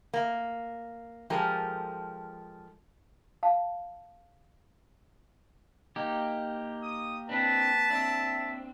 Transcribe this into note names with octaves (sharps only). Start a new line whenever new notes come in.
A#3
F3 G#3 G4 A4 A#4
F5 A5
A#3 D#4 G4
D#6
C4 D4 B4 A5
C4 D4 E5